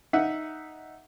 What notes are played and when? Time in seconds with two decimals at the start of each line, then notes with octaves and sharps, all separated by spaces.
0.13 D#4 E5 F#5